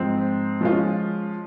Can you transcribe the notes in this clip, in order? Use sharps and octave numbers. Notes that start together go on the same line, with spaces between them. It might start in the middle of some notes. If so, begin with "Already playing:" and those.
Already playing: G#2 F3 C4
F3 G#3 C#4 F4